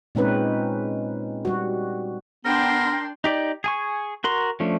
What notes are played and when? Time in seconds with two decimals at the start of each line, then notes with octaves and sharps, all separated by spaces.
0.15 A#2 G#3 C4 C#4 D#4 B4
1.45 G3 F#4
2.45 B3 D4 A#4 G5 C6
3.24 D#4 G4 D5
3.64 G#4 G#5 C#6
4.24 F#4 A#4 C6
4.60 F3 A3 C#4 D4